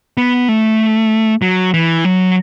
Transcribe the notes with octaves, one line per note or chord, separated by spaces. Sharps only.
B3
A3
F#3
E3
F#3